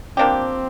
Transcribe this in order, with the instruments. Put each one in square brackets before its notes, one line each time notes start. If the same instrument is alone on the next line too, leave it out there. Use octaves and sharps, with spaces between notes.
[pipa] F3 A#3 D4 G4 [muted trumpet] C4